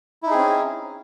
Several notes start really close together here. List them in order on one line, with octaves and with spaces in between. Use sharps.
E4 D#4 G#4 C4 C#4